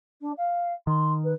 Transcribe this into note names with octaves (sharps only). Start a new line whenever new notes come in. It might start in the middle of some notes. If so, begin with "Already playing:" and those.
D4
F5
D#3 C6
B4